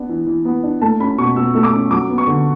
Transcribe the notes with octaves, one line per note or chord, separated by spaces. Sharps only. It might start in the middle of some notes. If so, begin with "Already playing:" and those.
Already playing: B3 D4
E3
E3
B3
D4
A3 A5
C#4 B5
B2 C#6
B2 E6
A3 E6
D6
C#4
F#3 D6
B3
C#6
D3